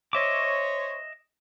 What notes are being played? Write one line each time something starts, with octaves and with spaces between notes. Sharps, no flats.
C5 C#5 D#5 E5 D6